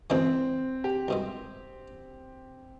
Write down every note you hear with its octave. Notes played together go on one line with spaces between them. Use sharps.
D2 C#3 E3 G#3 C4
G4
C2 B2 G#3